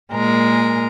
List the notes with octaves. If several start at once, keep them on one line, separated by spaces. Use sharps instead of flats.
A#2 G#3 A#4